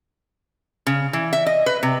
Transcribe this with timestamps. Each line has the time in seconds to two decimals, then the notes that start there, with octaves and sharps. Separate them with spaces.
0.87 C#3
1.13 E3
1.33 E5
1.47 D#5
1.66 B4
1.83 C3